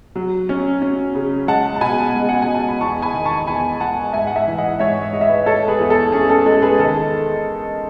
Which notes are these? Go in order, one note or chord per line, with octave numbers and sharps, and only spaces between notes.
F#3
C#4
C#4
C#3
G#3 F#5 A5
A5
B2 G#5 B5
G#3
F#5
G#5
G#3
A5
B5
E2 A5 C#6
G#5 B5
D#3
A5 C#6
E2 G#5 B5
G#3 F#5 A5
G#2 E5 G#5
F#5
E5 G#5
E3
D#5 F#5
G#2 C#5 E5
G#3 D#5
E5
B4 D#5
G#3 A4 C#5
G#4 B4
E2
A4
C#4 G#4
A4
G#3 A4
G#4 B4
D#3 A4